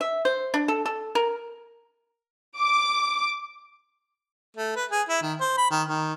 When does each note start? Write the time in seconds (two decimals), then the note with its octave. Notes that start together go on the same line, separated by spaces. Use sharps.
0.01 E5
0.25 C5
0.54 D4
0.68 A4
0.86 A4
1.15 A#4
2.58 D6
4.56 A3
4.76 B4
4.91 G#4
5.09 E4
5.22 D#3
5.40 C5
5.58 B5
5.71 D#3
5.88 D#3